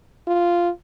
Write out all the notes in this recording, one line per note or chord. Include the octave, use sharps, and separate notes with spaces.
F4